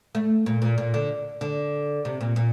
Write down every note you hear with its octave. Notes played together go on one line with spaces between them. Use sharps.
A3
A#2
A#2
A#2
D3
D3
C3
A#2
A#2